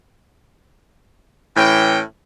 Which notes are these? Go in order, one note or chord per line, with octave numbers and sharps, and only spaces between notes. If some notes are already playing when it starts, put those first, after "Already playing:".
A2 E3 C#4 G5